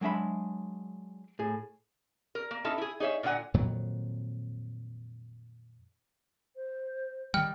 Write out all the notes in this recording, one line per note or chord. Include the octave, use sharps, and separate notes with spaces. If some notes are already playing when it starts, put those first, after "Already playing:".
F#3 G#3 D4 E5 B5
A2 G#4
A#4
A#3
C#4 D#4 E4 A4 A5
E4 G#4
D#4 G#4 C#5 E5
A#2 D3 D#4 F#5 G#5
F2 A#2 D#3 F#3
C5
D#3 G3 G5 F6